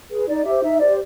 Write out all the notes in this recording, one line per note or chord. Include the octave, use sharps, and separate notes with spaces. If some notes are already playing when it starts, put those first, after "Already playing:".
G#4 B4
D#4 D5
G4 C5 E5
D#4 E5
G4 C5 D5